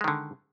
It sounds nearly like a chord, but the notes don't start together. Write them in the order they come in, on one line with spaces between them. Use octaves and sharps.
G#3 D#3 D3